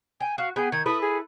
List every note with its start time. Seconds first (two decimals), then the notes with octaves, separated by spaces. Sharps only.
0.21 G5 G#5
0.38 F#4 F5
0.56 B3 G#4 G5
0.72 D#3 G#6
0.86 E4 A4 B4 D#6
1.01 G#4